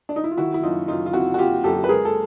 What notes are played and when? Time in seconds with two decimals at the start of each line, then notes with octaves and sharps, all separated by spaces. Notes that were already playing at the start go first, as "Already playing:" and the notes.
0.09 D4
0.16 D#4
0.24 E4
0.31 F4
0.37 D#3 E4 F#4
0.54 E4
0.63 F#2 D#4 F4
0.88 F#2 D#4 F4
1.06 F4
1.13 C4 E4 F#4
1.34 F#4
1.38 C4 F4 G4
1.64 F#2 G4 A4
1.84 B4
1.89 G#3 G#4 A#4
2.05 A4